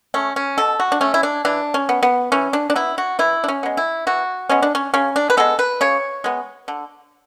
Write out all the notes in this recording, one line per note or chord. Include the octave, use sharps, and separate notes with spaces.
A3 C#4
C#4
B2 A4
F#4
D4
A3 C#4
E4
D4
E3 D4
C#4
B3
B3
E3 C#4
D4
D4
B3 E4
F#4
E3 E4
D4
C#4
G#3 B3
E4
E3 F#4
G#3 B3 C#4
D4
C#4
C#3 C#4
D4
B4
G#3 B3 A4
B4
C#3 C#5
G#3 B3
D3